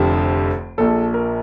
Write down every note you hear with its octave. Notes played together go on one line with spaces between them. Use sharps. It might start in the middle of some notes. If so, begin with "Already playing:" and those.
Already playing: F1 F2 D3 F3 G4
A#1 A#2 F3 A4
A#4